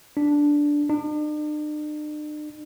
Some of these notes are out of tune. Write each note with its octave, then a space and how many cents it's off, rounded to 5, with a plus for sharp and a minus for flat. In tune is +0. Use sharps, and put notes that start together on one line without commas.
D4 -5
D4 +45